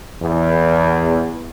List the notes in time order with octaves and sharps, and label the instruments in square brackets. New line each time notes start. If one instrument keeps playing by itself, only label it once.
[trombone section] E2